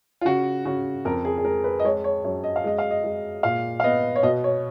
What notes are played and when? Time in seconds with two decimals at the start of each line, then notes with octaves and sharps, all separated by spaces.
0.21 F4
0.25 C#3 F#4
0.65 C#3 F#4
1.05 F2 A#4
1.25 G#4
1.38 G#4
1.44 G#3 A#4
1.64 B4
1.80 D#5
1.84 G#3 C#5
2.04 C#5
2.24 F#2 C#5
2.44 D#5
2.56 F5
2.64 G#3 D#5
2.78 F5
2.91 D#5
3.04 G#3
3.43 A#2 F5
3.80 F5
3.84 B3 D#5
4.16 C#5
4.23 B2 D#5
4.44 C#5